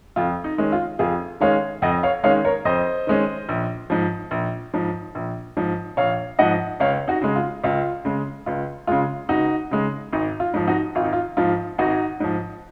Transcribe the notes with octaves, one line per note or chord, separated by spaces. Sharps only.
F2 F4
D#4
D#3 G#3 C#4
F4
F2 F4 G#4
D#3 G#3 C#4 C#5 F5
F2 D#5 F#5
C#5 F5
D#3 G#3 C#4 C#5 F5
A#4 C#5
F2 C5 D#5
D#3 G#3 C#4
A#1
G#2 F3
A#1
G#2 F3
A#1
G#2 F3
A#1 C#5 F5
G#2 F3 D#5 F#5
C#2 C#5 F5
D#4 F#4
C#3 G#3
F4
C#2 F4
C#3 G#3
C#2 F4
C#3 G#3 F4
C#2 D#4 F#4
C#3 G#3
G#1 D#4
F4
G#2 F3
D#4 F#4
G#1 F4
D#4
F4
G#2 F3 F4
G#1 D#4 F#4
G#2 F3